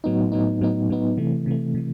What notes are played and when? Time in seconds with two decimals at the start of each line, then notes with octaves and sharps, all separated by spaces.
0.04 A2 F#3 B3 D#4
0.32 A2 F#3 B3 D#4
0.61 A2 F#3 B3 D#4
0.90 A2 F#3 B3 D#4
1.17 C3 E3 A3
1.46 C3 E3 A3
1.75 C3 E3